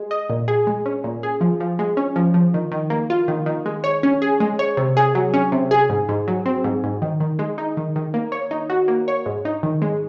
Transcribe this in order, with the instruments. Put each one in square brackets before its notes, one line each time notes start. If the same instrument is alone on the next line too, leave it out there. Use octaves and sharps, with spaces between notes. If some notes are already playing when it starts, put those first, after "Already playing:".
Already playing: [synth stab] G#3
D#5
A#2
G#4
G#3
C#4
A#2
G#4
F3
F3
G#3
C#4
F3
F3
D#3
D#3
A#3
F4
D#3
D#3
G#3
C#5
C#4
G#4
G#3
C#5
C3
G#4
F#3
C#4
C3
G#4
G#2
G#2
F#3
C4
G#2
G#2
D#3
D#3
G#3
D#4
D#3
D#3
A#3
C#5
D#4
F#4
A#3
C#5
G#2
D#4
D#3
G#3